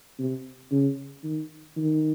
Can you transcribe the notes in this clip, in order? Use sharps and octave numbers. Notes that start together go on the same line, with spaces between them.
C3
C#3
D#3
D#3